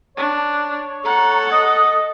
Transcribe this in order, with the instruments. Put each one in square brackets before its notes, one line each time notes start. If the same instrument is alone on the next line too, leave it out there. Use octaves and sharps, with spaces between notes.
[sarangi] D4 [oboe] C#5
[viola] A4 [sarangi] F#5 [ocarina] A#5
[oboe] D#5 [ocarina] D#6